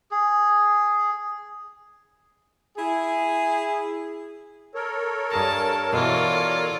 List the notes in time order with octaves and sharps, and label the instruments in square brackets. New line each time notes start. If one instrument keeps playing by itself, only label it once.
[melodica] G#4
[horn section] E4 G#4
[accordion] A4 A#4 C#5
[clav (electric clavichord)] G2 G#4 A#5 [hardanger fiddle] A5
[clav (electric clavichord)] B2 E3 [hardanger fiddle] F4 D5